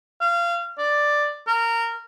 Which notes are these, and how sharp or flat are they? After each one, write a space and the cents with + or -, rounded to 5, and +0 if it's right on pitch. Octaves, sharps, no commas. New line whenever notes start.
F5 -25
D5 +5
A#4 -20